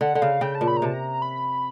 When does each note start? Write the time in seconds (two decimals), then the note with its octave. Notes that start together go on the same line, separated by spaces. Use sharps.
0.01 D3 F#5
0.15 D3 F#5
0.21 C#3 F5
0.41 C#3 G5
0.55 A5
0.61 A#2
0.68 B5
0.77 A#5
0.82 C3 A5
0.93 A#5
1.22 B5